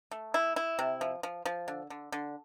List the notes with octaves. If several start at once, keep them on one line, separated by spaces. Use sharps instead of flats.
A3
E4
E4
C3
F3
F3
F3
D3
D3
D3